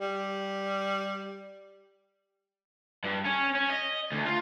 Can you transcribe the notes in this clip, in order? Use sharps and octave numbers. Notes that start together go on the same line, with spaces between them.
G3
G2
C#4
C#4
D#5
D2
F4